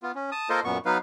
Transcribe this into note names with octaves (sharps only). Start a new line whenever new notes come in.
B3 F4
C#4
A5 D#6
A#3 F4 A4 A#4 C5 D#5
F#2 A#2 B3 C#6
F#3 B3 D#4 B4 F5